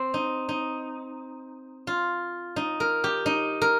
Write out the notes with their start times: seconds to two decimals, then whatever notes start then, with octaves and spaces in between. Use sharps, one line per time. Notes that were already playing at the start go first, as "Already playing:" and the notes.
Already playing: C4
0.14 D#4
0.49 D#4
1.87 F4
2.56 D#4
2.80 A#4
3.04 G4
3.26 D#4
3.61 A#4